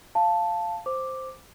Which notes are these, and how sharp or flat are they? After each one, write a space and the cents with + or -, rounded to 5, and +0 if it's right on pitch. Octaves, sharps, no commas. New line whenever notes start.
F5 -10 A5 +0
C5 +0 D6 +0